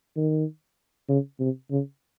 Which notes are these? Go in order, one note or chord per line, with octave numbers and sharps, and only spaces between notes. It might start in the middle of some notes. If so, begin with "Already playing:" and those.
D#3
C#3
C3
C#3